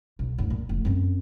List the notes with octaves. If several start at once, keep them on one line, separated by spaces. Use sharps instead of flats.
B1
D1 F#2
A#2
F1
F#2 C4